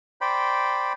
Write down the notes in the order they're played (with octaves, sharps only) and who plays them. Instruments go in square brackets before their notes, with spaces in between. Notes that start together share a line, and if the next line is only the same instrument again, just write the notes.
[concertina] C5 D5 G5 B5